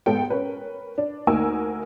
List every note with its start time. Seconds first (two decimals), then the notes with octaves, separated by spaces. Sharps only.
0.06 G#2 B3 A4 G5
0.30 C#4 A#4 B4
0.98 D4
1.27 D2 A#3 D#4 A#4 G#5 E6